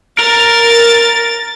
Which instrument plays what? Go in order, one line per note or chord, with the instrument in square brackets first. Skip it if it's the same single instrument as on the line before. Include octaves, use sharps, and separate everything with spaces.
[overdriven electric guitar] A#4 A#5 [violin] A6